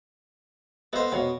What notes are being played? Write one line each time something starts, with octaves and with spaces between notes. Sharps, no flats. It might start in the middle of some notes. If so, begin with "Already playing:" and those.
B3 A4 C5 D#5 F5
B2 C#5 D#5 F5